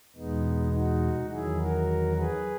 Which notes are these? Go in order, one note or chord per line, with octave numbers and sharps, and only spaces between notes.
E2 B2 G#3 B3 D#4
D#4 F#4
E2 D#3 F#3 E4 G#4
F#4 A#4
G#4 B4